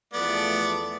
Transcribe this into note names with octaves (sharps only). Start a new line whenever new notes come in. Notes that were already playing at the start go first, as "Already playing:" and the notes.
E2 F3 A3 B3 D5